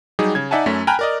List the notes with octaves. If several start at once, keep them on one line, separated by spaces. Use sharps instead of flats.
F#3 G3 D#4 G4 G#4
C#3 G#6
D#4 D5 E5 F#5 G#5 A5
F#2 A3 C#4 A4 B6
G5 G#5 A#5 B5 F6 F#6
A#4 D5 D#5